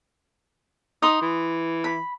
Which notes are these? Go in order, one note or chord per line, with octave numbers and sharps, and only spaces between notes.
D#4 C6 D#6
E3
B5